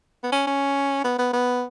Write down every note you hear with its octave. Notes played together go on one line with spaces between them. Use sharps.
B3
C#4
C#4
B3
B3
B3